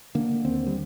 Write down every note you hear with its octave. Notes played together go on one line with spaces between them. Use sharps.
D3 A#3
D#2 C4
G3